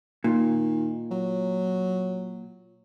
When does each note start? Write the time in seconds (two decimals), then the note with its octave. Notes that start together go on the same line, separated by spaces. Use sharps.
0.24 A#2 D#3
1.11 F#3